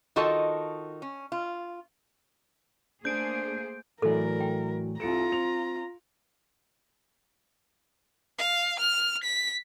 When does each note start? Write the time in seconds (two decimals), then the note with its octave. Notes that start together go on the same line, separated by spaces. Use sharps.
0.16 D#3 F4 F#4 A4 D#5 A5
1.02 C#4
1.32 F4
3.05 A3 A#3 D4 G#4 C5 G6 D7
4.02 A2 E3 F#3 E4 A4 A#4 D5 G#5
4.40 G5
5.00 C2 F4 A4 A#5 C#7 D7
5.32 C4 F7
8.38 F5
8.80 F6
9.24 B6